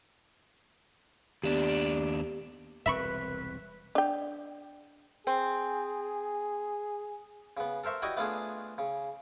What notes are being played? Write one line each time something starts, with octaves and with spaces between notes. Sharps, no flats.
D#2 B3 D4 G4
E1 C2 C4 B4 E5 B5 C#6
D4 G5
C4 G#4
C#3 B3
A4 A#4 C5 E5 C#6
E4 F#4 G4 D5 D#5 C#6
A3 B3 D4 F4 G#4 A4
C#3